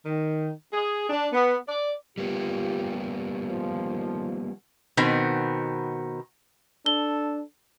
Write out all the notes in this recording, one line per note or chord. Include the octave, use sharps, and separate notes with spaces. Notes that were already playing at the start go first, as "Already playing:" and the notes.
D#3
G#4
D4
B3
D5
G3 A#3 B3 F4 G4
D#3 F3
B2 D#3 B3 C4
D4 A4 G7